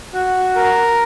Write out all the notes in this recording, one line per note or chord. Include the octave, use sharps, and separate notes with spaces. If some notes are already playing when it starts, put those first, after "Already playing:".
F#4
A#4